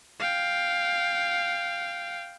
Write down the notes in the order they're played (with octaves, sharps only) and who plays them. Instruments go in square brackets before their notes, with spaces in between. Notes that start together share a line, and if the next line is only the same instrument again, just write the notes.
[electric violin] F5 G5